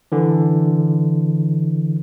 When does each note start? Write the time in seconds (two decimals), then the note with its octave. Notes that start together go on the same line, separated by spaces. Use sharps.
0.12 D3 E3